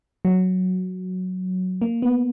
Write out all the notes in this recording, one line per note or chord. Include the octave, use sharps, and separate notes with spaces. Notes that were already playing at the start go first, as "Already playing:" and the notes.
F#3
A#3
B3